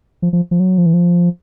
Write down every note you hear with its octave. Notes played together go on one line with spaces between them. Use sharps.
F3
F3
F3
F#3
F3
E3
F3